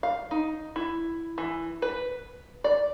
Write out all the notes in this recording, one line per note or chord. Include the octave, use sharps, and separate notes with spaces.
F5
D#4
E4
E3
B4
D5